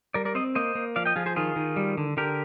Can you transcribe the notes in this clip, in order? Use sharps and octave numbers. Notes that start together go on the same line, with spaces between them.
G3 A#4 D5
A#4 D5
C4 C5 D#5
A#3 C5 D#5
A#3
F3 D5 F5
D#5 G5
F3 F4 G#4
G#4 C5
D#3 F4 G#4
D#3
G3
D3
D3 G4 A#4